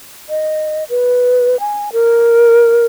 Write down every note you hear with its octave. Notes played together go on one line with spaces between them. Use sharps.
D#5
B4
G#5
A#4